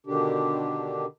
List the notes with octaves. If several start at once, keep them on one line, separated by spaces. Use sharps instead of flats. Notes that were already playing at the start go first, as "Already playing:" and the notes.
B2 D3 D#3 D4 G4